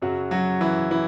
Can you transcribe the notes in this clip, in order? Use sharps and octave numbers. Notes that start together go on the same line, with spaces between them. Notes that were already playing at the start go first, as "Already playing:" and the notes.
F#2 C#3 F#3 F#4
F#3 F#4
E3 E4
E3 E4